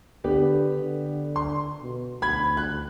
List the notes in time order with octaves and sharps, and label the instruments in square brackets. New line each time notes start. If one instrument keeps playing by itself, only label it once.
[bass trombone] D3 [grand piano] B3 G4 B4
[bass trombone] D3
[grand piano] C6
[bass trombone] B2
[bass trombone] D2 [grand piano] B5 G#6
[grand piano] F#6